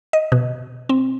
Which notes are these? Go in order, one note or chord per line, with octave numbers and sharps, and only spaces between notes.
D#5
B2
C4